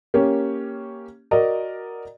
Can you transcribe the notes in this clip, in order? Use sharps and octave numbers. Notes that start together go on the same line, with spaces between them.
A#3 C#4 G4
F#4 A#4 D5 D#5